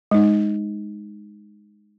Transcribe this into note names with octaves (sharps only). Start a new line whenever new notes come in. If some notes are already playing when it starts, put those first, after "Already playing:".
G#3 D#4